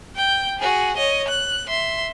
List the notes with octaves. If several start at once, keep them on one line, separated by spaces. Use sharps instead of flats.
G5 G6
F#4 G#4
C#5 D#5
F#6
E5 C6